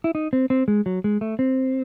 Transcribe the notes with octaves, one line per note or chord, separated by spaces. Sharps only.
E4
D#4
C4
C4
G#3
F#3
G#3
A3
C4